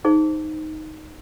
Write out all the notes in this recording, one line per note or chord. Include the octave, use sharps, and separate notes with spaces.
D#4 G#4 C5 C#6